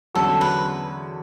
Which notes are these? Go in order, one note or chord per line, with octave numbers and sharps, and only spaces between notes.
E2 D3 F#3 C#4 F#4 A4
B4